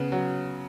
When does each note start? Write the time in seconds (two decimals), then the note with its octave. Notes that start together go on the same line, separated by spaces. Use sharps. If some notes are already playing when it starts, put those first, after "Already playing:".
Already playing: C#3 B3
0.12 F#3